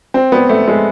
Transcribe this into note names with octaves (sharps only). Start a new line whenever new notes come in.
C4
B3
A3
G#3